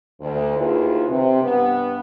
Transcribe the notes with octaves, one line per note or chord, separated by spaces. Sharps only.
D2
D#2 E4 F4 G#4 B4
C3
G2 B3